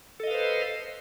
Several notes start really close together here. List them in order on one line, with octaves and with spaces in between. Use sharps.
A4 D#5 F5 B4 C5